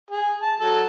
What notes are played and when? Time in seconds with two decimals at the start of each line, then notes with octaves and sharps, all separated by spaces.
0.10 G#4
0.42 A5
0.60 F#3 A4